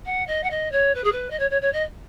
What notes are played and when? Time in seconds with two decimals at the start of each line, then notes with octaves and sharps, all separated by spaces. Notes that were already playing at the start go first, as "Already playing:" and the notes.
0.05 F#5
0.27 D#5
0.43 F#5
0.50 D#5
0.72 C#5
0.95 B4
1.04 G#4
1.12 B4
1.30 D#5
1.39 C#5
1.50 C#5
1.61 C#5
1.73 D#5